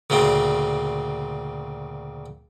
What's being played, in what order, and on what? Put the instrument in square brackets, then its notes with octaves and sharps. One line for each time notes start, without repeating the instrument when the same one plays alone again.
[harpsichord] D2 A#2 C#3 C4